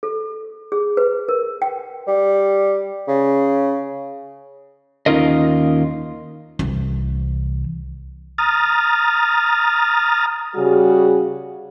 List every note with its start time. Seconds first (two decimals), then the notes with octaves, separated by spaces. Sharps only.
0.03 A4
0.72 G#4
0.97 B4
1.29 A#4
1.62 G5
2.07 G3
3.08 C#3
5.06 D#2 C#4 D#4 F4 A#4 D#5
6.59 C2 E3
8.38 A#5 D#6 F6 A6
10.56 C#3 G3 F#4 G#4